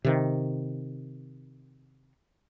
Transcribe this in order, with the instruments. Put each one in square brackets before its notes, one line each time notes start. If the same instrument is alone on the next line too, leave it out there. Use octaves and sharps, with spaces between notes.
[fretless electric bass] C3 D#3